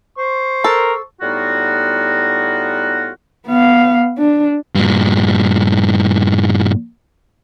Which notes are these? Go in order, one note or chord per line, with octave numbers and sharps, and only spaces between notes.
C5 C#6
A4 A#4
A2 G3 B3 D#4 F4 F#4
B3 F5
D4
G2 A#2